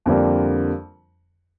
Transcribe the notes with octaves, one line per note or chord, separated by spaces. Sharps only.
F2 D3 G3 A#3 D4